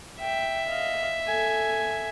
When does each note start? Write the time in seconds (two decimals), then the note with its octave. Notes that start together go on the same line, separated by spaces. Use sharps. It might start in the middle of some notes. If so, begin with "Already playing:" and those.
0.20 E5 G5
0.67 D#5 F5
1.27 A4 G#5